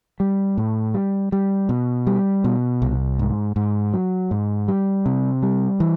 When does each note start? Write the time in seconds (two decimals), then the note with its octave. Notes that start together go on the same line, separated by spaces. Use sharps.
0.20 G3
0.58 A2
0.94 G3
1.32 G3
1.69 B2
2.07 G3
2.44 B2
2.82 C2
3.19 G#2
3.56 G#2
3.93 F#3
4.31 G#2
4.68 G3
5.06 C3
5.43 G3
5.80 E3